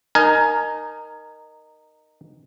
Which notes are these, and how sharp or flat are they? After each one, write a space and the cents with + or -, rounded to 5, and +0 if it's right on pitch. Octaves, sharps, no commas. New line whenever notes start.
D#4 -15 A#4 +0 G#5 +20